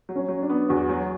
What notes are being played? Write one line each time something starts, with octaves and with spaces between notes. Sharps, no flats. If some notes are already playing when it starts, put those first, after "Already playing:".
F#3
C#4
F#3
D4
B3
E2 F#4
F#3